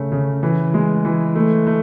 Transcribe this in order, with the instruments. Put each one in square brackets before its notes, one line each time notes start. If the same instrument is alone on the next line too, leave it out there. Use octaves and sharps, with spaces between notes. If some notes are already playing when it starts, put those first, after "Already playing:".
Already playing: [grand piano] C#3 A3
C#3
E3
G#3
E3
A3
A3